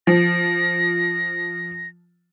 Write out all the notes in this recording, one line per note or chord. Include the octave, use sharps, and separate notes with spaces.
F3 A#6